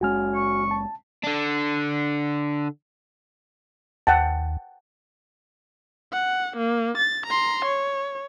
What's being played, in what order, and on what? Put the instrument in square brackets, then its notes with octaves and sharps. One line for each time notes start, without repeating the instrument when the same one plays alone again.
[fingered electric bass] F#1 G#3 C#4 [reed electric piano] F#4 G#5 F6
[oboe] C#6
[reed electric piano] A5
[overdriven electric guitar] D3 D4
[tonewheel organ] D#2 [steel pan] F#5 G5 A5
[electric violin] F#5
A#3
A6
A#5 C6
C#5